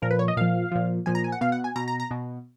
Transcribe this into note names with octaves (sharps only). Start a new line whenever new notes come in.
A#2 F3 A#4
B4
C#5
D#5
A#2 F3 F5
A#2 F3
A#2 F3 G#5
A#5
G#5
F#5
B2 F5
F#5
G#5
B2 A#5
A#5
A#5
B2